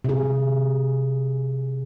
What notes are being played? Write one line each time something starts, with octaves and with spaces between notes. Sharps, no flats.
C3 G#4